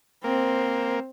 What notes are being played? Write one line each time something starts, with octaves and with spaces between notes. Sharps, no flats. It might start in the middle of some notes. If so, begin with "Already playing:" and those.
A#3 C4 C5